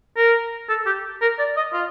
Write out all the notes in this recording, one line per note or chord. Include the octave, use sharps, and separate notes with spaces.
A#4
A4
G4
A#4
D5
D#5
F4